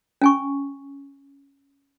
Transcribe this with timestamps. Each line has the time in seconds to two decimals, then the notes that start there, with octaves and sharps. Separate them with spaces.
0.21 C#4 G#5 C#6